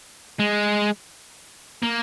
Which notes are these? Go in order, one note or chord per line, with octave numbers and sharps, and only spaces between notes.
G#3
A#3